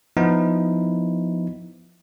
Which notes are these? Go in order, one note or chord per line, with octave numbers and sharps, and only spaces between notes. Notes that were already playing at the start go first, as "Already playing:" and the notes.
F3 B3 D#4 E4